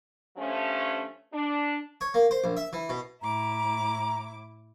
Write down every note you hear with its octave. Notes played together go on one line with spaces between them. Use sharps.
G2 F3 A3 C#4
D4
C#5
A#3
C5
A#1
E5
E3
B2
A2 E4 A#5 D6